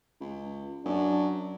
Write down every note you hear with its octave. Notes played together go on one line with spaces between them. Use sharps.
C#2
F#2 D4